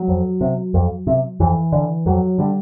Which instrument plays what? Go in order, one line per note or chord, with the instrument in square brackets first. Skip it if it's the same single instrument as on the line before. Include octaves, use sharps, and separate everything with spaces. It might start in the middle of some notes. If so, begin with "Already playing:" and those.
Already playing: [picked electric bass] F#3
F2
C3
F2
C3
F2 E3
D3
F2 F#3
D3 G3